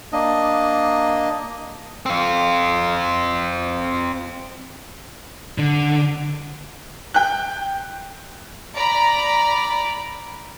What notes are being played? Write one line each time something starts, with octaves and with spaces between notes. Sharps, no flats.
A#3 D4 D#5
C4 F4
D3
G5 F#6
D5 A#5 B5